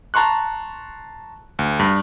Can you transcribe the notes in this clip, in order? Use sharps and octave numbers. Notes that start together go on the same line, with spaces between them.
A5 A#5 C6 C#6 F#6
D2
G2